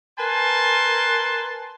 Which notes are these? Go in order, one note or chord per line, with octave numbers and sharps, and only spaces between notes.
A#4 B4 G#5 A5 C6